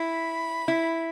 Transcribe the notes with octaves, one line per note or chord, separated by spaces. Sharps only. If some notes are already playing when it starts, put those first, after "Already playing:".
Already playing: E4 B5
E4